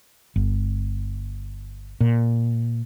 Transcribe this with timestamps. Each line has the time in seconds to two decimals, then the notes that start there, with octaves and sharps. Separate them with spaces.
0.36 G1
2.01 A#2